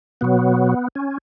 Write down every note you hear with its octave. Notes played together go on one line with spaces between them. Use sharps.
B2 F#3 B3
C#4